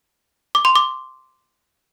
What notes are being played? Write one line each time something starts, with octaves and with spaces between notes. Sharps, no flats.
D6
C6
D6